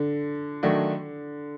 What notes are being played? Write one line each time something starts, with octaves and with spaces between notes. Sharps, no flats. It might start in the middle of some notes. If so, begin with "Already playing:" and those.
Already playing: D3
D#3 F#3 A3 D4